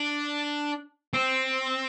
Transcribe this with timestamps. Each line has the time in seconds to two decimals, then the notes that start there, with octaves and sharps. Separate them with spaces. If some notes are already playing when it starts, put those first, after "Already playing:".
Already playing: D4
1.14 C4